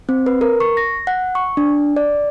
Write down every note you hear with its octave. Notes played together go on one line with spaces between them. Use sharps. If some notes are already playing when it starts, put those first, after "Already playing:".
C4
B4
A#4
C#6
A#6
F#5
C#6
D4
D5